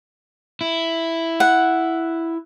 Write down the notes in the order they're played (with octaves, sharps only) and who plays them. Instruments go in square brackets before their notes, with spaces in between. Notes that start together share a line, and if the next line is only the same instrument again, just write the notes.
[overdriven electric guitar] E4
[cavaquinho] F#5